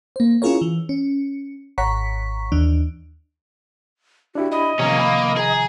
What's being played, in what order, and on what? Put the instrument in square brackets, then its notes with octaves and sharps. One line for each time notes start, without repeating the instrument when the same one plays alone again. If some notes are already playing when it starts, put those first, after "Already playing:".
[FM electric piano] A#3 C5
C#4 E4 F4 G#4 A#4 C#5
E3
C#4
G#1 C#5 F#5 A#5 C#6 B6
D#2 E3 D4
[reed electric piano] D4 E4 G4 [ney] F#4
[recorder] D#5 [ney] B5
[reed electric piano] C3 D#3 F3 [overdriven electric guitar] A#3 C#4 [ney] A#5
[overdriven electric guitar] A#3 [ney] B5
[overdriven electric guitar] G#4 [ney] A#5